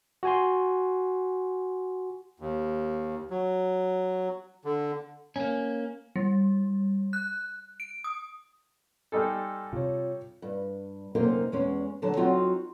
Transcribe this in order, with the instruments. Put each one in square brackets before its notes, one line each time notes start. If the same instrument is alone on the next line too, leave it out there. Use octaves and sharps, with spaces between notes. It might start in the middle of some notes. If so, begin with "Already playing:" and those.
[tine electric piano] F#4 G#5 C6
[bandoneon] D#2
F#3
D3
[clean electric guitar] A#3 C#4
[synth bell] G3
F#6
D7
D#6
[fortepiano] G3 D#4 A4 [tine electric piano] G#5 C6 F6
[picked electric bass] C3 [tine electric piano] F4 C#5
[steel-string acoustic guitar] G2
F#2 C3 A#3 D#4 A#4 C5
E2 G#3 C#4
D3 F#3 A5
F#3 C4 D#4 F4 F#4